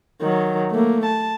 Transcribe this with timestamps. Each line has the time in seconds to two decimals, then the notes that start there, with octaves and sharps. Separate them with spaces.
0.22 D#3 F#3
0.71 A3 A#3
1.06 A5